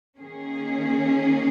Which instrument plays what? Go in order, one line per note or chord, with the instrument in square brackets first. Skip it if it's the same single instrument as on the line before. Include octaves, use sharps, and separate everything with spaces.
[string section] D#3 A#3 C#4 G#4